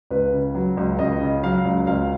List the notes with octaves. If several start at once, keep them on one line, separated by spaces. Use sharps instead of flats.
C#2 B4
C#3
F#3
C#2
C#2 D#5
C#3
F#3 F5
C#2
C#2 F5